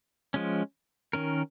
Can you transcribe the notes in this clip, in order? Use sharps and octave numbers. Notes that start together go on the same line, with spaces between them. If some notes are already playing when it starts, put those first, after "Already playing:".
F3 G#3 C#4
D#3 C#4 A#4